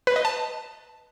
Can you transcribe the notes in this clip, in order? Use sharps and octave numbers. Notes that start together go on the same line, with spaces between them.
B4
D#5
A5